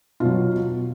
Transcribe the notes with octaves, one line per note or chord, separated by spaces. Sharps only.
B2 F#3 F4